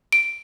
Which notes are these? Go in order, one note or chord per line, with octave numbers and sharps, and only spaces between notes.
D7